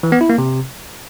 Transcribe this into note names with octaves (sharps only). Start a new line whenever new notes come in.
E3
B3
E4
A#3
C3